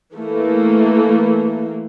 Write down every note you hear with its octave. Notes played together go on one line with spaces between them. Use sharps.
E3 A3 A#3